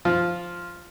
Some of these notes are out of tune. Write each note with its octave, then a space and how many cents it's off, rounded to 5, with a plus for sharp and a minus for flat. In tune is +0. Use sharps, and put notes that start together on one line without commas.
F3 +0 F4 +0